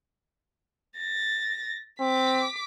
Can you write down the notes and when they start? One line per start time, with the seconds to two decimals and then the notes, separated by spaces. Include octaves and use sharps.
0.97 A6 A#6
2.00 C4 D6 B6